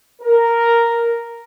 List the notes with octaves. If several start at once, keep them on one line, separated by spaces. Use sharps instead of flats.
A#4